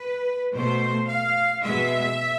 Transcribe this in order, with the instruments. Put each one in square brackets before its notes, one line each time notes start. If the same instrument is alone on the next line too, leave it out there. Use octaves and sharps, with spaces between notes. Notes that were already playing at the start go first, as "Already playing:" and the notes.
Already playing: [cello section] B4
B2 A3 C5
F5
B2 G#3 E5